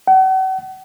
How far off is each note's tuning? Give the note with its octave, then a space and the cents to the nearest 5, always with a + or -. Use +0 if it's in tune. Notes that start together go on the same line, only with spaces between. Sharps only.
F#5 +40